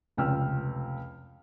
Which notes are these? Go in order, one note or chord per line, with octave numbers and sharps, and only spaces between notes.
F1 C#2 G5 E6 F6